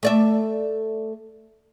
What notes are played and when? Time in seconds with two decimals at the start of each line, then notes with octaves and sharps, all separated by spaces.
0.03 A3 D5 E5